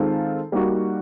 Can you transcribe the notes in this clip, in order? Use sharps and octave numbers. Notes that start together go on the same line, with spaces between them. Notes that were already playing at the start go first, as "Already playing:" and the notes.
Already playing: D#3 G#3 C4 F4 A4
G3 A#3 D#4 F#4